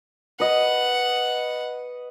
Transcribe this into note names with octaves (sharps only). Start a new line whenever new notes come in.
B4 D#5 F#5